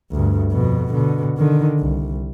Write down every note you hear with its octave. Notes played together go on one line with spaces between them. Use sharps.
D2 G2
F2 B2
B2 D3
D3 D#3
C2